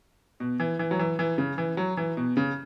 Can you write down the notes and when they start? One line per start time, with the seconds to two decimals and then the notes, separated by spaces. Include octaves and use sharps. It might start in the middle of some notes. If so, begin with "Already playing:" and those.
0.40 B2
0.60 E3
0.79 E3
0.91 F#3
0.99 E3
1.19 E3
1.38 C#3
1.58 E3
1.77 F#3
1.97 E3
2.17 B2
2.37 C#3